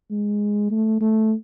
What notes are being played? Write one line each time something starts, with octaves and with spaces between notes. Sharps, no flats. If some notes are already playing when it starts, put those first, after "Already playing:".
G#3
A3
A3